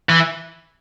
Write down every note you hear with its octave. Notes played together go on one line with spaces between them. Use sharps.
E3